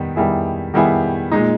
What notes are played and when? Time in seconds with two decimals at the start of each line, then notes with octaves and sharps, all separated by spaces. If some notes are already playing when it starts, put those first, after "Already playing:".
Already playing: D#3 G3 B3
0.16 D#3 G3 B3 E4 G#4
0.74 D#3 G3 B3 E4 G#4
1.32 A#2 G#3 D#4